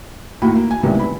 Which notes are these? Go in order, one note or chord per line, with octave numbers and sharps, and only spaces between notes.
D#2 A2 A#3 F#4 B5
A#3
G#5
C#2 A2 C3 D#3 G3 B3
B5